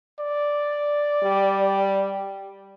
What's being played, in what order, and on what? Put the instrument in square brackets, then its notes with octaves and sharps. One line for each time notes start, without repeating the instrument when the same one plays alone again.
[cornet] D5
[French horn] G3